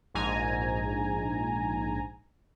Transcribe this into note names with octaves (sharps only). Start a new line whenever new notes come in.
A#1 G#2 G#5 A#5